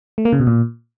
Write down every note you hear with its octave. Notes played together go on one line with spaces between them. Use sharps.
A3
A#3
C#3
B2
A#2